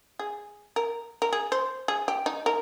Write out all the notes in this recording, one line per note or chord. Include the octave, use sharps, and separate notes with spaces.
G#4
A#4
A#4
G#4
C5
G#4
G4
D#4
A#4